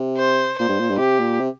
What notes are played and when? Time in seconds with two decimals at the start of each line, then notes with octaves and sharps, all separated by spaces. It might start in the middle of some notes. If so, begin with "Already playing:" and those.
Already playing: C3
0.17 C5
0.59 A#2 C5
0.68 G2
0.80 A#2
0.90 G2
0.99 C3 G4
1.20 A#2
1.40 C3